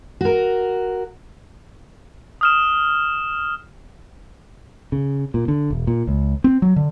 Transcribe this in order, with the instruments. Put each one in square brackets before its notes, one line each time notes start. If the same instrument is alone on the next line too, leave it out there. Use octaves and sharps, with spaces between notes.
[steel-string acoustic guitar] F#4 A#4
[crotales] D#6 F6 E7
[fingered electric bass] C#3
A#2
D3
E1
A#2
C#2
C4
F#3
D3